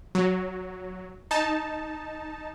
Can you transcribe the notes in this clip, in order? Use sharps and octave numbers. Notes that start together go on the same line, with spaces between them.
F#3
D#4 A5